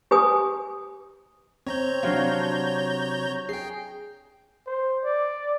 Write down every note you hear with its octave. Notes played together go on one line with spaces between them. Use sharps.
G4 B4 G#5 D#6
C4 C#5 A#5 G6
C3 F#3 D4 F5
G#4 G5 C7
C5
D5